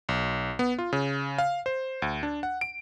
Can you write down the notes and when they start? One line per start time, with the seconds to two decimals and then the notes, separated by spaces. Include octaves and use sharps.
0.09 B1
0.59 B3
0.79 F4
0.93 C#3
1.38 F5
1.66 C5
2.02 D2
2.23 D4
2.43 F#5
2.61 D7